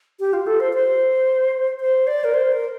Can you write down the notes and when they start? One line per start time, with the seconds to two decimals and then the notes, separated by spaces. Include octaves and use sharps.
0.20 G4
0.33 F4
0.47 A4
0.60 C5
0.74 C5
1.81 C5
2.07 D5
2.24 A#4
2.34 C5
2.52 A#4